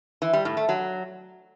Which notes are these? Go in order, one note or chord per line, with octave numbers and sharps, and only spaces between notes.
E3
G3
A2
A3
F#3